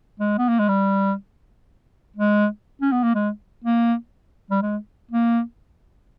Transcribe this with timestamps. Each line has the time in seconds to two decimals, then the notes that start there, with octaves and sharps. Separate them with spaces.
0.20 G#3
0.38 B3
0.49 A#3
0.59 G#3
0.69 G3
2.17 G#3
2.81 C#4
2.92 B3
3.03 A#3
3.15 G#3
3.64 A#3
4.51 G3
4.62 G#3
5.11 A#3